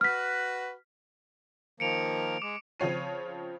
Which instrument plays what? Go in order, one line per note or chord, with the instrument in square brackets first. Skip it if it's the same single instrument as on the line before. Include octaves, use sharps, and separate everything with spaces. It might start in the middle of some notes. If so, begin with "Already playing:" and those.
[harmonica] F#4 B4 [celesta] F6 B6
[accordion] D#3 F3 A#3 [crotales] C#7 D7 F7
[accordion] G#3 [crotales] D6
[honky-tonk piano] C#3 F3 C4 C#5 C7 D#7